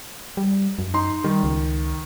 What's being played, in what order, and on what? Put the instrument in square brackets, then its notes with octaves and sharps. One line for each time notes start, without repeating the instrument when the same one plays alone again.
[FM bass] G3
F#2
[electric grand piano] D#4 C6
[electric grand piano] D#3 [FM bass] G3
[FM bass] C#2